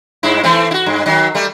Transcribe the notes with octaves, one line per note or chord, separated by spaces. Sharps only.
G2 E4
E3 A3 C4
E4 F#4
G2
D#3 F#3
G3 A3